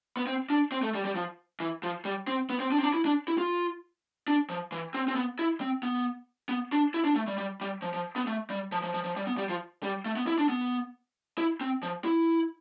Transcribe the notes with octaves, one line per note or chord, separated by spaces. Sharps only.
B3
C4
D4
C4
A3
G3
G3
F3
E3
F3
G3
C4
B3
C4
D4
C4
D4
E4
D4
E4
F4
D4
F3
E3
C4
C4
B3
E4
C4
B3
B3
D4
E4
D4
A3
G3
G3
G3
F3
F3
B3
A3
G3
F3
F3
F3
F3
G3
B3
G3
F3
G3
A3
B3
E4
D4
B3
E4
C4
F3
E4